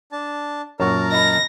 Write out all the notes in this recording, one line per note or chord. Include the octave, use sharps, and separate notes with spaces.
D4 A5
F#2 A#2 F#3 A#4 C#5 A5 A#5 C#6
D#5 B5 A#6